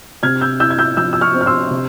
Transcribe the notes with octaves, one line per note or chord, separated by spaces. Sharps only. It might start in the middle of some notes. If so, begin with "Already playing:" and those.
C3 F6 G#6
E6 G6
E4 E6 G6
G#6
E6 G6
F3 E6 G6
E6
C#6 F6
C4
F6
C6 E6
C3